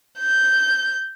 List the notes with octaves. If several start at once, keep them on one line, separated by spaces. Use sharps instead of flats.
G6